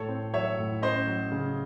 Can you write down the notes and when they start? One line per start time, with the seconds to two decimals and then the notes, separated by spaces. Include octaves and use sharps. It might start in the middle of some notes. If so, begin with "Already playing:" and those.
Already playing: A2 A4 C#5
0.08 C4
0.33 F#3 C#5 E5
0.59 A2
0.82 C#4 C5 D#5
1.07 F#3
1.32 C#3